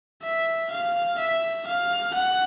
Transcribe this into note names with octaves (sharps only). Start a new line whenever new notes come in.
E5
F5
E5
F5
F#5